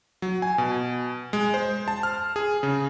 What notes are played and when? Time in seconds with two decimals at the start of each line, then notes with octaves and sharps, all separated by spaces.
0.22 F#3
0.42 G#5
0.58 B2
1.33 G#3
1.54 C5
1.88 A5
2.03 F6
2.36 G#4
2.63 C#3